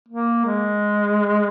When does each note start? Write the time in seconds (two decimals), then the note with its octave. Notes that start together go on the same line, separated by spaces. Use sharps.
0.09 A#3
0.45 G#3